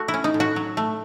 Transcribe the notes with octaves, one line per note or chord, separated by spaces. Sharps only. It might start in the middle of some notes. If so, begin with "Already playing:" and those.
Already playing: A3 F#4
E4
C#4
D#4
A2
F#4
F#3
A3